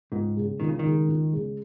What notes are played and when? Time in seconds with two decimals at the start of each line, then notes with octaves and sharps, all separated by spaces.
0.12 C#2 G#2
0.37 C#3 G#3
0.60 C#2 D#3
0.69 C#3
0.79 D#3
0.85 C#3 G#3
1.08 C#2
1.33 C#3 G#3